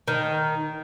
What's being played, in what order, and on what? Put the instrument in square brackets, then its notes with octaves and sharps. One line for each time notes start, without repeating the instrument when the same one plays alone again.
[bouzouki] D#3